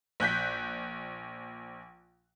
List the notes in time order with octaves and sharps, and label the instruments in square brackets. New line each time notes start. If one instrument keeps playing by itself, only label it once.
[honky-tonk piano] A#1 F#6 G6 B6